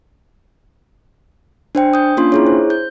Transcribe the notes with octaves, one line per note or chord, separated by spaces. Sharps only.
D4 C5 G5
D#6 G6
A#3 C#4 D4 F4 C6
E4 G#4 C#5
C5
G6